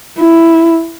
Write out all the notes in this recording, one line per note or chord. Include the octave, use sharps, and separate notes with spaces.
E4